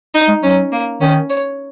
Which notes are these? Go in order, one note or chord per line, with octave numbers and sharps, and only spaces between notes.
D#4
G#3
F#3 C#4
A#3
D#3 C#4
C#5